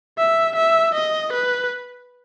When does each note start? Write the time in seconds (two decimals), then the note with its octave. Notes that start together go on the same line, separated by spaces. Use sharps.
0.18 E5
0.56 E5
0.94 D#5
1.32 B4